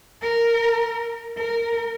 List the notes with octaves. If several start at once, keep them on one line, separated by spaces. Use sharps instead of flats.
A#4
A#4